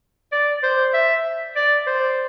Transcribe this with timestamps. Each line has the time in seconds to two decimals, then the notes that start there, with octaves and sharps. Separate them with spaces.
0.32 D5
0.63 C5
0.94 E5
1.56 D5
1.87 C5